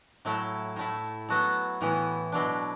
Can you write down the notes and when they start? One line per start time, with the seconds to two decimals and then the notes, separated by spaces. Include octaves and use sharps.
0.25 A2 F#3 A3 E4 A4
0.76 A2 A3 E4
1.29 F#3 B3 F#4 A4
1.81 A2 E3 B3 E4
2.32 B2 F#3 D4